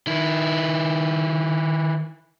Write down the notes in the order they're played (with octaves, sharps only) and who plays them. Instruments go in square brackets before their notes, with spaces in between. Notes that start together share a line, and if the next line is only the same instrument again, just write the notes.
[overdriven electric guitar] D#3 E4